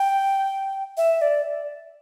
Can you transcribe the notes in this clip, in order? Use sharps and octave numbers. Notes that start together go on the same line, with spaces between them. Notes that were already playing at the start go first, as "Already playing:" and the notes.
Already playing: G5
E5
D5